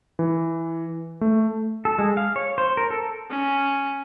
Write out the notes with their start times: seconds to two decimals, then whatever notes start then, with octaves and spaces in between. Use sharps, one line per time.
0.19 E3
1.21 A3
1.85 A4
1.99 G#3
2.17 F5
2.36 C#5
2.58 C5
2.77 A#4
2.90 A4
3.30 C#4